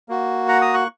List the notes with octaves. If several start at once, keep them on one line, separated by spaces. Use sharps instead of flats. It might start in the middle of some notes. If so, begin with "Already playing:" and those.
A#3 F#4
F#5 A#5
A#5 D#6
C#6 F#6